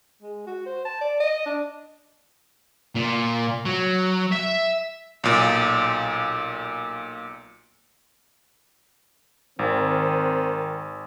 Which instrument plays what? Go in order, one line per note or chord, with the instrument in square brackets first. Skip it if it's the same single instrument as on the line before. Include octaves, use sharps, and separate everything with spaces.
[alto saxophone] G#3
F#4
C5
A5
D5
D#5
D4
[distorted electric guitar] A#2
F#3
E5
[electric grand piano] B1 A#2
[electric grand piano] G#1 [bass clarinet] D#3 [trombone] C4